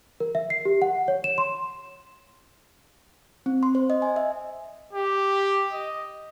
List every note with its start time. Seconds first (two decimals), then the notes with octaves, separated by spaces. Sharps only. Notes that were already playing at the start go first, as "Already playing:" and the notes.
0.20 A#4
0.35 E5
0.50 C7
0.65 G4
0.82 F#5
1.08 C#5
1.24 E7
1.38 C6
3.46 C4
3.63 C6
3.75 C5
3.90 D#5
4.02 G#5
4.16 E5
4.93 G4
5.73 D#5